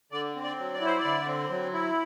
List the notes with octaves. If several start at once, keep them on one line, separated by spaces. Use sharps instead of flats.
D3 D5
C4
D5
F#3
D5
E4 C5
D5
D3
C4
F#3
E4